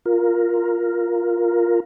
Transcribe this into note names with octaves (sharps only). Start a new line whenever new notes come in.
F4 A#4